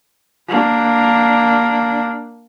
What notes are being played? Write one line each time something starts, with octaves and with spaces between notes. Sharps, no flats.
A#3 D4